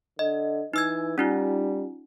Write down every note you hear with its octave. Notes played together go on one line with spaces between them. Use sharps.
D3 D#5
E3 D#4 E6 G#6
G3 C#4 D#4 F4